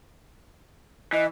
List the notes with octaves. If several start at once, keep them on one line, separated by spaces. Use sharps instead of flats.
E3 D#5